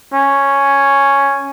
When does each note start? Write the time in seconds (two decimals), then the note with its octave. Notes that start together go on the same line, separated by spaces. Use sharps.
0.13 C#4